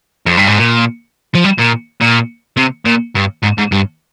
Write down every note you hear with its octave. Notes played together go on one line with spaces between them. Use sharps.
F2
G2
G#2
A#2
F3
G3
A#2
A#2
C3
A#2
G2
G#2
G#2
G2